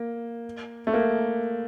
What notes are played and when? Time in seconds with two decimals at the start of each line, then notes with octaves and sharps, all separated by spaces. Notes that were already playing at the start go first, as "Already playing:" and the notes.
Already playing: A#3
0.87 A3
0.94 A#3